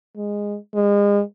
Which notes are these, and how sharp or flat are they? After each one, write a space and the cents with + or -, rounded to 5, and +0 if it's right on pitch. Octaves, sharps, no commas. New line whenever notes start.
G#3 -15
G#3 -35